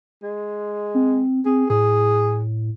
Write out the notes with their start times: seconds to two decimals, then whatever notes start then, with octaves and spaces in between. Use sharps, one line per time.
0.23 G#3
0.95 C4
1.46 C4 G#4
1.70 A2 G#4